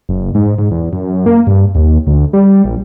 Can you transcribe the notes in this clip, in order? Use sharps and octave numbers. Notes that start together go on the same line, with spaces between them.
F#1
G#2
G#2
E2
F#2
A#3
G2
D#2
D2
G3
A#1